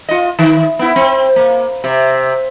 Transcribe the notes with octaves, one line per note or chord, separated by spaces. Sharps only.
F4 D#5
D#3
B3 E4
C4
A#3
C3